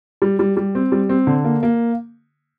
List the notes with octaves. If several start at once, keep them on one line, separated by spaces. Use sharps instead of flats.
G3
G3
G3
C4
G3
C4
D3
A#3
A#3